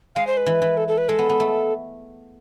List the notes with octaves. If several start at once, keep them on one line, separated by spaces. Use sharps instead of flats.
G#3 F5
C5
B4
E3
E3
A4
A4
B4
G#3 A4
B3
B3
A3